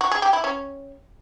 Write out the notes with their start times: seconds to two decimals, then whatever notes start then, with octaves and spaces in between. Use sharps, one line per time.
0.01 F#4
0.11 G#4
0.22 G4
0.33 E4
0.44 C#4